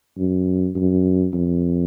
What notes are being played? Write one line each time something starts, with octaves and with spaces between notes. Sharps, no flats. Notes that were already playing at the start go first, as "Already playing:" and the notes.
F#2
F#2
F2